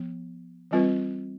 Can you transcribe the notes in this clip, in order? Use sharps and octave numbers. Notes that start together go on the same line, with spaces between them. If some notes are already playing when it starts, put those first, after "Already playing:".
Already playing: F3 B3
E3 G3 C4 F4 B4